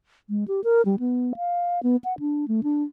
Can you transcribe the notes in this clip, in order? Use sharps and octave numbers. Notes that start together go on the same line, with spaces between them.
G#3
G4
A#4
G3
B3
F5
B3
F#5
D4
A3
D4